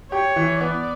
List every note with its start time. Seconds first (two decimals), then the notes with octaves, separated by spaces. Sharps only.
0.12 G4 C#5
0.36 E3
0.61 B3 D5